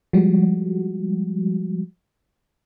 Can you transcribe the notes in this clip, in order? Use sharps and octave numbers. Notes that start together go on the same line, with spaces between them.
F3 G3 G#3 F#4